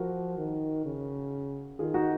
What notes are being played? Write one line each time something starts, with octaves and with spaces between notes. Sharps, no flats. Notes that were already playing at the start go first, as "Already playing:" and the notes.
Already playing: F3 F#4 A#4
D#3
C#3
D#3 F4 G#4
D#4 F#4